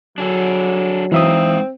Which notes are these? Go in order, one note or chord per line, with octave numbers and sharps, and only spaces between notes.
F#3 D4 G#4 A4
E3 G#3 C4 D#4 E5 F5 D#6